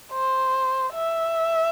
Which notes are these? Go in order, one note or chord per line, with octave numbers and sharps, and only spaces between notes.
C5
E5